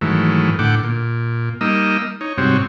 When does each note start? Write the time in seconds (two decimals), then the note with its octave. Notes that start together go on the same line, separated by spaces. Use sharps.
0.01 G#2 D#3 E3 F#3 A3
0.59 A2 D3 F#5 G5 D6
0.84 A#2
1.61 G3 A#3 D#4 D#5 E6
2.21 D#4 C#5
2.38 G#2 C3 G3 C4 F#4 C#5